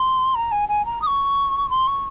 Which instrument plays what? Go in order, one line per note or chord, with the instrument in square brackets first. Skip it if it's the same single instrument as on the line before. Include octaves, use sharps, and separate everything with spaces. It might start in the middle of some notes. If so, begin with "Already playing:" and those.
Already playing: [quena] C6
A#5
G#5
G#5
A#5
D#6
C#6
C6
C#6